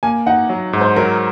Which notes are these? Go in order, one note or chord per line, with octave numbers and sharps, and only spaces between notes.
A#3 G#5
D#4 F#5
F#3
G#2
C5
F#3 A#4